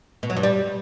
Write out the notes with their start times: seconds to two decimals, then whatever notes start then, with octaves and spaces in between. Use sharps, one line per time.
0.23 B2
0.30 F#3
0.36 G2
0.43 G3